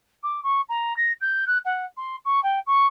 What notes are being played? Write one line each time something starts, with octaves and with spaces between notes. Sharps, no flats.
D6
C#6
A#5
A#6
G6
F#6
F#5
C6
C#6
G5
C#6